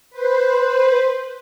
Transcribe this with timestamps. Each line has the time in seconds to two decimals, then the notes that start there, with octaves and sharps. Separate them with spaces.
0.10 B4 C5